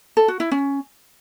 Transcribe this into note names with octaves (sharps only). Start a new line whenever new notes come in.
A4
F#4
E4
C#4